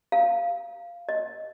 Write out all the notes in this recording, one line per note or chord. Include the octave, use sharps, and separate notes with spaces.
F5
D#5